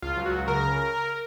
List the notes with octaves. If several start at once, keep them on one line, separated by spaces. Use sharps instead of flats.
C#2 F4
F#3
F#4
C#2
C#3 A#4